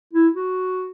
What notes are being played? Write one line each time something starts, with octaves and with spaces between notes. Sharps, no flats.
E4
F#4